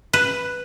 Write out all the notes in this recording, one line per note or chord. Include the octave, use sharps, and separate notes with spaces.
B4